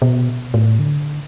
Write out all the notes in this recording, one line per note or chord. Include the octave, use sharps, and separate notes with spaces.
B2
A2
D3